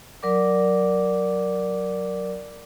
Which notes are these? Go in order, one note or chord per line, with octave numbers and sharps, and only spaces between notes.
F#3 A#4 D5 D6